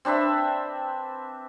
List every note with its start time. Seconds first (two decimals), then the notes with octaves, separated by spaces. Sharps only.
0.05 C4 D4 B4 E5